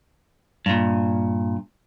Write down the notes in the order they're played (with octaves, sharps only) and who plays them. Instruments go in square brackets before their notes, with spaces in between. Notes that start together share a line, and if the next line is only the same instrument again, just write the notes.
[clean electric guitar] G2 A#2